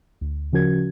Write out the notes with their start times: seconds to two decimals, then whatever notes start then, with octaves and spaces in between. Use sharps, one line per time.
0.21 D2
0.52 C#3 F3 C#4 F#4 A#4 G#6